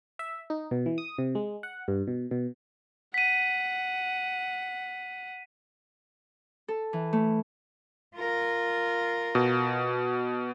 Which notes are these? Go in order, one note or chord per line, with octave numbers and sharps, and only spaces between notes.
E5
D#4
B2
E3
D#6
C3
G#3
F#5
G2
B2
B2
F#5 B6 D#7
A4
E3
A3
F4 A#4
B2